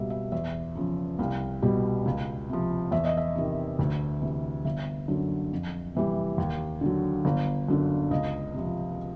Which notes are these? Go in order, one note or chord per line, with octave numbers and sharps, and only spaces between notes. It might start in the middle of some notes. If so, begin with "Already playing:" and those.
Already playing: C#2 B2 G3 E5 F5
E5
E2 E5
C#3 F3
C2 F5
B2 G3
C#2
C3 F3
E2 E5
D#5
E5
C3 D#3
D2
C3 E3
G1 E5
F#2 D3 F#3
F2
C3 E3 G3
D#2
D3 F#3
G1
F#2 D3
C#2 D#5
C3 F3